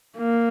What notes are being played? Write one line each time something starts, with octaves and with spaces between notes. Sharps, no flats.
A#3